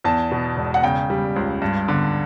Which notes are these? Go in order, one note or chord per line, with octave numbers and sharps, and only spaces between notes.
E2 A5
B2
E1
F#5
C#3 G5
G3
C#2
G2
D3